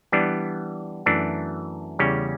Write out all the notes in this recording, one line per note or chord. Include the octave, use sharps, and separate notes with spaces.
E3 G3 B3 D4
F#2 E3 A3 D4
E2 C#3 G3 C#4